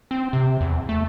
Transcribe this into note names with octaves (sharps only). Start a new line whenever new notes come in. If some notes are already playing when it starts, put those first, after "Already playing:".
C4
C3
E2
A3